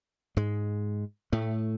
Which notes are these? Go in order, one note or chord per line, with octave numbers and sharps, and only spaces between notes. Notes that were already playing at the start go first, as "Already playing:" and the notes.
G#2 G#3
A2 A3